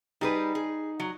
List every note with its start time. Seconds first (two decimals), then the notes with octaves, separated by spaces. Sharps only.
0.21 G3 D#4 G#4 B4
0.55 G#4
1.00 F#3